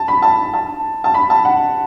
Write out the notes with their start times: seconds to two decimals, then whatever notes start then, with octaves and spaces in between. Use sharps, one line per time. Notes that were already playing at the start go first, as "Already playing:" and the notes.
Already playing: A5
0.08 B5
0.22 A5
0.54 A5
1.04 A5
1.14 B5
1.30 A5
1.45 F#5